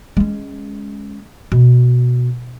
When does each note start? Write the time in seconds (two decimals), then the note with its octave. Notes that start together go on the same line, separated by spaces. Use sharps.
0.17 G#3 C#4
1.52 B2